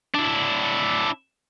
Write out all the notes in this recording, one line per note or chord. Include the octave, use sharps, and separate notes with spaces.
D4 E4